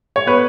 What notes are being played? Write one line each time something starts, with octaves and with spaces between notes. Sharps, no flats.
C#5
B3 B4